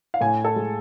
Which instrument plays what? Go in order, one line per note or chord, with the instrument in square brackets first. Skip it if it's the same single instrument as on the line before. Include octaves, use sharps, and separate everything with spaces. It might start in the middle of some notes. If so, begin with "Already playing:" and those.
[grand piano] F5
A2 G#5
A4
G#3